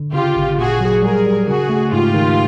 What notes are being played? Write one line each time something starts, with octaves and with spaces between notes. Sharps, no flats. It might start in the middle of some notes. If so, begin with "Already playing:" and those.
Already playing: D3
C#3 F4 G4
G#1
A#2 F#4 G#4
F#3
G3 G#4 A#4
G3
C#3 F#4 G#4
A3
G#2 F4 G4
D#3